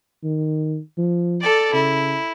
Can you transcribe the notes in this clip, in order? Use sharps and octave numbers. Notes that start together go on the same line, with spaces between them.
D#3
F3
A4 D5
C#3 E4